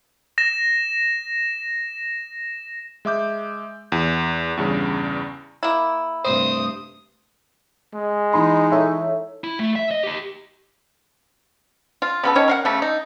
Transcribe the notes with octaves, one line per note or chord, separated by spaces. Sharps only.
A#6 E7
G#3 E5 D6 G6
E2
E2 G2 C#3
A#3 E4
G2 C3 A3 C5 D#6
G#3
E3 D#4 B5 C6
E3 A4 C#5 E5
E4
A3
E5
D#5
D#4 G4
F4
C#3 B3 A4
D#3 C#4 C#5
A#4 F5 F#5
C#3 A3
D#4